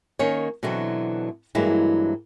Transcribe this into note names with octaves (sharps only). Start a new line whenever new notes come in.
D#3 A#3 C#4 C#5
B2 D3 E3 F#3 C4
G2 E3 F#3 G#3 A#3 E4